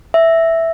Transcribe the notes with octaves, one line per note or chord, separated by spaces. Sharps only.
E5